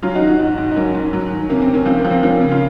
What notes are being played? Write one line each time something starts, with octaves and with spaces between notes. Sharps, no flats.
F#3 C#4 F4
D#4 F#4
D#3
D#4 F#4
G#2
G#2
D#4
F#3 A#3 C#4
G#2
F#3
D#3
C3 A#3 C#4
C4
C3
A#3 C#4
F3 C4
A#3
F3
C4
F3 A#3 C#4
C#3
F4